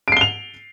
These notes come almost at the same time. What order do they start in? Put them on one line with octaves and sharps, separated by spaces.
D7 C7 G7 F7